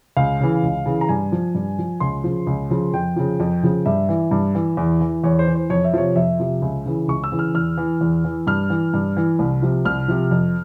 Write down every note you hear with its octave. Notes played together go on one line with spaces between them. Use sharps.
C#2 F5
C#3 E3
C#2
C#3 E3
A#5
G2 G#5
F3
G2
F3
C#2 C6
C#3 F3
C#2
C#3 F3
F2 G5
C#3 F3
F2
C#3 F3
G2 E5
E3
G2
E3
E2
E3
E2 C#5
C5
E3
C5
F2 C#5
E5
C3 F3 C#5
F2 E5
C3 F3
C#2
C#3 E3
C#2 C#6
E6
C#3 E3
F6
E2 F6
E3
E2
E3
G2 F6
E3
G2
E3
C2
C3 F3
C2 F6
C3 F3
F2